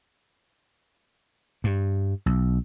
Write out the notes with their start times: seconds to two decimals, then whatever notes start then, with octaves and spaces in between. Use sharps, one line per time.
1.64 G2
2.26 B1